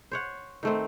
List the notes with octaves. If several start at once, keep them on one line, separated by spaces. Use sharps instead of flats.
C5 C#5 F#5
D#3 A3 C4